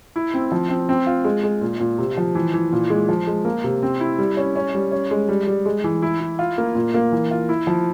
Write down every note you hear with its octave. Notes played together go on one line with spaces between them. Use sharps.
E4
C4
F3
C4
C4
F4
G#3
G#3
A#2
A#2
C3
F3
E3
E3
A#2
G#3
F3
G#3
A#3
C3
C4
E4
G3
C#4
C#4
G3
C#4
G#3
G3
G3
G#3
E3
E4
E4
F4
A#3
A#2
A#3
E3
F4
E4
F3